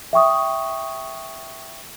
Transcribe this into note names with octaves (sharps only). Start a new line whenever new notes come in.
E5 G5 C#6 D#6